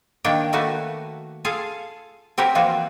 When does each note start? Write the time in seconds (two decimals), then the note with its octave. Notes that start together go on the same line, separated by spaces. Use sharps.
0.24 D#3 A#3 D4 C#5 G5 A#5
0.53 D#3 A3 A#3 F#4 B4 A5
1.45 F4 G#4 A4 F5 A5
2.38 C4 F#4 G4 A#4 B4 C#5
2.55 E3 F3 A#3 C4 F4 F#4